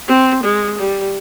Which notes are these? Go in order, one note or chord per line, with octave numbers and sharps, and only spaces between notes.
C4
G#3
G3